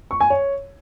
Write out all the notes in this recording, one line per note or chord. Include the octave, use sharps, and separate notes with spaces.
C#6
G#5
C#5